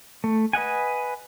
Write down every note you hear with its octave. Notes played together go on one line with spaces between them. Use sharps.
A3
B4 D#5 F#5 G#5